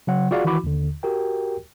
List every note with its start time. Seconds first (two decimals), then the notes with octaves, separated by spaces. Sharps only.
0.07 C#3 F#3 F#5
0.31 F4 F#4 G#4 D5 F5 F#5
0.45 D#3 E3 E4 F#4 B5 D6
0.64 D#2 D3
1.03 F#4 G4 A#4 G5